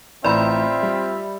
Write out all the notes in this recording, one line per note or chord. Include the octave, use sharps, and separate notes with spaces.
A1 A2 C4 F4 D5 E5 A#5 B5
G3